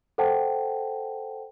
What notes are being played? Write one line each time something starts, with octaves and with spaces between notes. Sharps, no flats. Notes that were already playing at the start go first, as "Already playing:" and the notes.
A4 C5 F#5 G5 A5